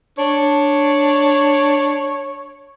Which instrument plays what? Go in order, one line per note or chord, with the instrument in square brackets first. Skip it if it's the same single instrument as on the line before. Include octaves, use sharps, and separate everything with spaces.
[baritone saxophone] D4 [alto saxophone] C#5